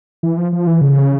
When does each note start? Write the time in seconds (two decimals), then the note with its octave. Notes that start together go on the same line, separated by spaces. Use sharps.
0.23 E3
0.38 F3
0.53 F3
0.67 E3
0.81 C#3